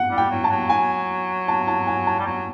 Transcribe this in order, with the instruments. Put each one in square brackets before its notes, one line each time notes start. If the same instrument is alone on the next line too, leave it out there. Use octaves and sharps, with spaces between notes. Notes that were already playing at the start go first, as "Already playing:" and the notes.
Already playing: [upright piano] F#5
[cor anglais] G3
[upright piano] G5
[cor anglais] F#3
[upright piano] A5
[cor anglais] F#3
[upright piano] G#5
A5
A5
G#5
A5
[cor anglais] G3
F#3